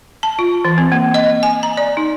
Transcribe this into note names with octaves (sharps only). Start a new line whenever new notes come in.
A5
F4
E3
C4
A#3
D#5
G#5
A#5
D5
D#4